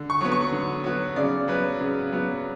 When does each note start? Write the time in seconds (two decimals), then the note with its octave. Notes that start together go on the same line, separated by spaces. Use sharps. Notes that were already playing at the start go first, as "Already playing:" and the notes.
Already playing: D3
0.10 C#6
0.21 F#3 B3
0.32 C#6
0.52 D3
0.84 F#3 B3
1.16 C#3 D5
1.48 F#3 B3 B4
1.81 C#3
2.12 F#3 B3